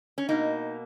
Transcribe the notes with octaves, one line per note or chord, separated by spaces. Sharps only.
C#4
B2 A#3 D#4